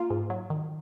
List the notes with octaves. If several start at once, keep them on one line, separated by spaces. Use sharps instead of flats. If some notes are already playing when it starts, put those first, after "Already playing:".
Already playing: A#3 F4
G#2
F#3
D#3